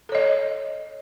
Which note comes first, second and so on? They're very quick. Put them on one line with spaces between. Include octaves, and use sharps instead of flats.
A4 C#5 D#5